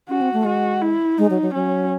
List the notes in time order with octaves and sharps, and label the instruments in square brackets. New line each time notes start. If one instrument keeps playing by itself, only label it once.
[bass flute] C#4 [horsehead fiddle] F#4
[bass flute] C4
A3
[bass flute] G#3 [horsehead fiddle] F#4
[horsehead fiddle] E4
[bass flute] G#3 [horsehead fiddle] D#4
[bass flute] F#3
F#3
[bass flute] F#3 [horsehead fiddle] C#4